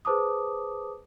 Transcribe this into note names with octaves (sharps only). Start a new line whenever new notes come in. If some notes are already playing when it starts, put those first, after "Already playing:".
G#4 B4 C5 A5 D6 D#6